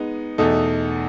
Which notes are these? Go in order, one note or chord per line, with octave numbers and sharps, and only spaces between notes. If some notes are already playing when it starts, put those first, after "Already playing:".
Already playing: G#3 B3 D#4
E2 B2 A3 D#4 A4